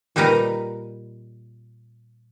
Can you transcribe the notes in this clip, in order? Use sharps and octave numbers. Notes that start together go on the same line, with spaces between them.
A#2 G3 D#4 A#4 B4 A#5